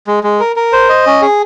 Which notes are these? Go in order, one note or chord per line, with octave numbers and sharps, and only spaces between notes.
G#3
G#3
A#4
A#4
C5
D#5
C#4
G#4